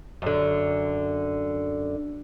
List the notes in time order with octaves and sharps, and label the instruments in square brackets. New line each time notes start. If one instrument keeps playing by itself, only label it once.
[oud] F#2 D3